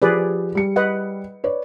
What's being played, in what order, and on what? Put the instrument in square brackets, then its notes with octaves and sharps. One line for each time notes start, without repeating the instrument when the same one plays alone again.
[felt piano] F3 G4 [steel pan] G#4 B4 D5
[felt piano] G3 C#7
[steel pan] B4 D#5 F#5
[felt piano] B4 C#5 D5